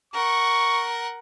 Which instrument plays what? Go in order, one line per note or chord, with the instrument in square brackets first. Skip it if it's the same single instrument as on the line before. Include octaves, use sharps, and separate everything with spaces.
[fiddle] A#4 F#5 [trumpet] C#6